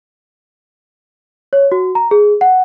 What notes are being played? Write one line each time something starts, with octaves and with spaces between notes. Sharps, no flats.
C#5
F#4
A#5
G#4
F#5